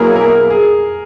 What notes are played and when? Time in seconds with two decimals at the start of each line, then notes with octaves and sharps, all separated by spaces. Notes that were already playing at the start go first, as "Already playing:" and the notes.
Already playing: B2 F#3 A#3 E4 G#4 A#4
0.16 A#4
0.50 G#4